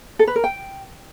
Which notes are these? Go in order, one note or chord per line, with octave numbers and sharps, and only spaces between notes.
A4
B4
A#4
G5